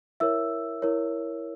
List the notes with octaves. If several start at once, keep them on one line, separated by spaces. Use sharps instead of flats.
E4 A#4 C#5 E5 E6
E4 A#4 C#5